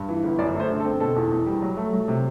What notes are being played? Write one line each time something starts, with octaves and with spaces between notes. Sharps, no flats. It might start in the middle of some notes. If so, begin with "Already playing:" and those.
Already playing: G2
E3
G1
F#2 D5
A3
C5
D3
A4
C4
B2 A4
E2
E2
G3
F#3
A3
F#3
C3